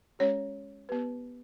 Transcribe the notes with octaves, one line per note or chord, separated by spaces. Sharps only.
G#3 C#4 G4 C#5
B3 G4 B4